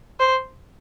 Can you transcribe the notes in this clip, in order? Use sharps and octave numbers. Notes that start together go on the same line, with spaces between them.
C5